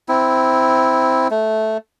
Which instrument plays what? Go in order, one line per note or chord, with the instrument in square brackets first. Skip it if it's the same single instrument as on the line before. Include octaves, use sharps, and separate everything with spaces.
[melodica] C4 E4
A3